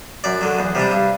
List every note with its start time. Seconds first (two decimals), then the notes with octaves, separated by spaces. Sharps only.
0.24 F#2 D5
0.41 D3 F#3
0.59 E2
0.75 C3 G3 D4
0.91 G2